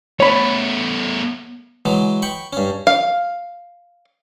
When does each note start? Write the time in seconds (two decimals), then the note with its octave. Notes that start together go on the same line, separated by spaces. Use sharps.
0.20 A3 B3 C#5 B5
1.85 E3 F#3 G#3
2.22 G5 B5 C#6
2.53 G2 C#4
2.87 F5